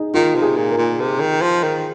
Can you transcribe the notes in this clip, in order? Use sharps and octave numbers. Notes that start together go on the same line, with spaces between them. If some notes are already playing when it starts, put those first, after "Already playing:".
Already playing: D#4 G#4
D#3 F4
C3
G#4
A#2
A#4
A#2
C3
D#3
F3
D#3